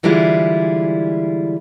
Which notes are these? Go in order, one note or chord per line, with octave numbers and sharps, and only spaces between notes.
D3 E3 G3 G#3 E4 F4